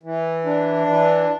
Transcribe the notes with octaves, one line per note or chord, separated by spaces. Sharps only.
E3
D4
E3